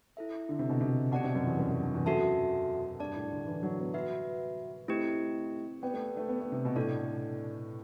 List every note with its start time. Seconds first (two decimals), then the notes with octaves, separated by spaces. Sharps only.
0.17 E4 A4 E5
0.49 D3
0.59 C3
0.69 B2
0.81 C3
1.11 B2 G4 D5 F#5 A5
1.24 C3
1.35 F#2
1.47 E2
1.59 F#2
1.71 F#2
1.83 G2
1.94 E2
2.06 F#2 F#4 A4 E5 A5
3.00 G2 G4 D5 A5
3.16 A2
3.32 D3
3.46 E3
3.63 F#3
3.78 B3
3.94 F#4 B4 E5
4.88 A3 C4 E4 G4
5.82 B3 G4 D5 G5
5.94 A3
6.17 A3
6.29 B3
6.41 A3
6.52 C3
6.65 B2
6.76 A2 D4 A4 D5